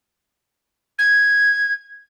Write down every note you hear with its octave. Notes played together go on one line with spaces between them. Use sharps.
G#6